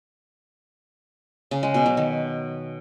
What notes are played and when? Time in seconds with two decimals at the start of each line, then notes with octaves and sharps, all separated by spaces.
1.51 C#3
1.63 G#3
1.74 B2
1.86 F#3
1.97 D#3